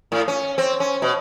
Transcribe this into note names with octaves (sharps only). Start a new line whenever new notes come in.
A2
C#4
C4
C#4
B2